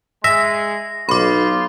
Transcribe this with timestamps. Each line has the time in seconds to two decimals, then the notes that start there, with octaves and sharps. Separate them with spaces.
0.24 G#3 E5 A#6
1.09 B1 D#4 F4 B5 C6 D6